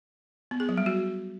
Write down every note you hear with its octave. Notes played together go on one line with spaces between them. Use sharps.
B3
G#4
F#3
G3
F#4